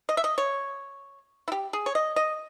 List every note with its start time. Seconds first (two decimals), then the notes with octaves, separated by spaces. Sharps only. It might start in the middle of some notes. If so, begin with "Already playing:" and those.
0.09 D#5
0.17 E5
0.24 D#5
0.38 C#5
1.48 E4
1.52 G4
1.73 G#4
1.86 C#5
1.95 D#5
2.16 D#5